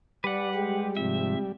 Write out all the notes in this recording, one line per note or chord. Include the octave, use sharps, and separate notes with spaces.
G3 B4 D5 F#5
G#3 G4
G#2 C3 F3 E5